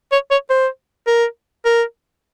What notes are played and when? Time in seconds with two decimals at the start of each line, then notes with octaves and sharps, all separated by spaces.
0.12 C#5
0.31 C#5
0.50 C5
1.07 A#4
1.65 A#4